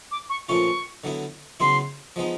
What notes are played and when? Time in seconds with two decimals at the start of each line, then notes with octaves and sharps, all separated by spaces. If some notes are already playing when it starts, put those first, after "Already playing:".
0.11 D6
0.29 C#6
0.48 A#2 F3 A3 C#4 F4 C#6
1.04 D3 F#3 B3 E4
1.60 C#3 F#3 B3 E4 C6
2.16 F3 G#3 B3 D#4